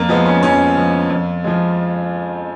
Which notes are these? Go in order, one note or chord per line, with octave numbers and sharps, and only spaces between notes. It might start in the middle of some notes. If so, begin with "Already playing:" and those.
Already playing: F2 A#3
F3 G#3 B3
C#4
F2 C#4
F3 G#3
F2
F3 G#3